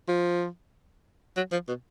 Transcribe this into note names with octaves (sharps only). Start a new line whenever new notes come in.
F3
F#3
F3
B2